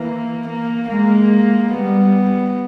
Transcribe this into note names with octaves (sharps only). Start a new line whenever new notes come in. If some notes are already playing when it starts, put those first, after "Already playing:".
Already playing: E3 A#3
A#3
G#3 A#3
G3 B3